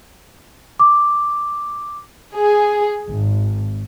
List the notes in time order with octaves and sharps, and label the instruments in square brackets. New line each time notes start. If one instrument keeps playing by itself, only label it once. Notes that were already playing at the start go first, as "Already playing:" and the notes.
[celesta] D6
[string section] G#4
G#1